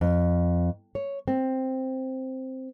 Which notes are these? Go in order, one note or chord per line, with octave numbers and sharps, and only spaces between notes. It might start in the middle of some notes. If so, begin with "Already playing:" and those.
F2
C#5
C4